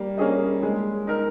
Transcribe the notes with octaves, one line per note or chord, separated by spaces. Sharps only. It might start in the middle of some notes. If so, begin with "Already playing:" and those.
Already playing: G3 A#3
A#3 C#4 G#4 D#5
G#3
D#4 A#4